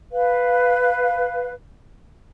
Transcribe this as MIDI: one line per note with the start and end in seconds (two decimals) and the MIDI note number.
0.12 1.50 71
0.12 1.50 77